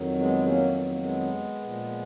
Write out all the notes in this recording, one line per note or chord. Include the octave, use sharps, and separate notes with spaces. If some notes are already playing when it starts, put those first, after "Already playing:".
Already playing: F2 D#3 F#3
G#3 B3
A#3 C#4
B3
A#3
G#3 B3
A#2 F3 G#3